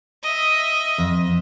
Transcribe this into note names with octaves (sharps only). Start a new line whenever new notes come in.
D#5 E5
F2